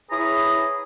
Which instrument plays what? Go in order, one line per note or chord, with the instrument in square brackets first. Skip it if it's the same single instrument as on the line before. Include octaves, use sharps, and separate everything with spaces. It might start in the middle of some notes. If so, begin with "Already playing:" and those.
[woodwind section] E4 G#4 B4 C#5 A#5 D#6